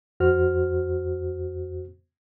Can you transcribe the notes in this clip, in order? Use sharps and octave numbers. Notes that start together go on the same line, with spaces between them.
F2 F#4 C5 F6